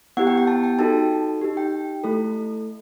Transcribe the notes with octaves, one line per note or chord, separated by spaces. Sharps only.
B3 E4 G4 F#5
G5
G5
A5
G5
D#4 F#4 A4 A5
D#4 G4
G5
A3 E4 A4